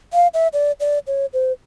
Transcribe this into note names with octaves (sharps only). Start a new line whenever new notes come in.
F5
E5
D5
D5
C#5
C5